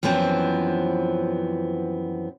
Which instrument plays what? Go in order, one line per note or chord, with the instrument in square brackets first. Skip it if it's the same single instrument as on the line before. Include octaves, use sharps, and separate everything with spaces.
[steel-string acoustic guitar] F#2 E3 F3 B3 C4